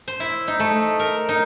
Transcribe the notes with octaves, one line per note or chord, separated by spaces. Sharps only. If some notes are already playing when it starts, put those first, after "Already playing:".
C5
E4
D#4
A3
A#4
D#4